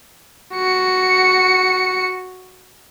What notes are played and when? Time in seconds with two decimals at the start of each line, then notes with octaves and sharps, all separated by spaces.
0.54 F#4 C#7